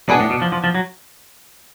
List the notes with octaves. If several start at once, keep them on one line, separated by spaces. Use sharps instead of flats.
B2 B3 D4 G#4 B4 D5
A2
B2
F3
F3
F3
F#3